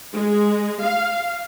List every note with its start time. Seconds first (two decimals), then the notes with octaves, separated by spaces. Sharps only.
0.14 G#3
0.81 F5